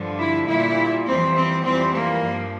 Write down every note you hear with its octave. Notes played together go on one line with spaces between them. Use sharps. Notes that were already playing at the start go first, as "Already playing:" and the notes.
Already playing: G2 D3 F3
E4
A#2 G3 E4
F2 E3 G3 C4
C4
F2 E3 G3 C4
A#3
G2 F3